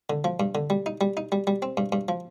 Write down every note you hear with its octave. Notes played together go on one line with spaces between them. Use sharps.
D3
F3
G2
D3
G3
D#4
G3
D#4
G3
G3
C4
G2
G2
F3